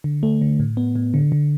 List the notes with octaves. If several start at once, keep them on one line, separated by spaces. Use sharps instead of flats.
D3
A3
D3
A2
B3
A2
D3
D3